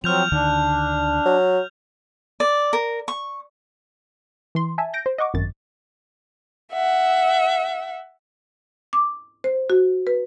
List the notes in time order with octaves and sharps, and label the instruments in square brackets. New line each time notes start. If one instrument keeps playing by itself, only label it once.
[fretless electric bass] F3 [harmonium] F#3 C4 [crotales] F6 G6 F7
[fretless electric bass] D2 D3 D#3 [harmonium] D4
[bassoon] F#3
[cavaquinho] D5
A#4
C#6
[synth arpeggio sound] E3 C6
E5 G#5 A5
G6 A#6 D7
C5
D#5 F#5 C#6 D6
G#1 F#2 A6
[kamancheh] E5 F#5
[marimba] D6
C5
F#4
B4